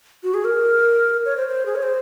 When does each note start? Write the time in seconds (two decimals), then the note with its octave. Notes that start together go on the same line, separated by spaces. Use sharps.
0.23 F#4
0.34 G#4
0.45 A#4
1.25 C#5
1.37 C5
1.48 C5
1.66 G#4
1.76 C#5
1.83 C5